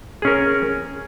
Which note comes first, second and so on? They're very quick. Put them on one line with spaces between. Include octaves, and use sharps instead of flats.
G#4 C#4 A#4